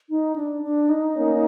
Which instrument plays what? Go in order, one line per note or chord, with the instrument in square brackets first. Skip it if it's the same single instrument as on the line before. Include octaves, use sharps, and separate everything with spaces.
[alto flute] D#4
D4
D4
D#4
[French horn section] A#3 C#4